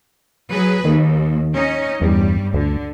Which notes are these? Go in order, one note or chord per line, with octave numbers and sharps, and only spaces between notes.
F#3 G#4 B4
D#2 D#3
C#4 D#4 D#5
E2 G2 G3
D2 D3